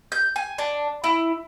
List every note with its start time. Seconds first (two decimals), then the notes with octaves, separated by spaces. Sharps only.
0.12 G6
0.36 G#5
0.58 D4
1.04 E4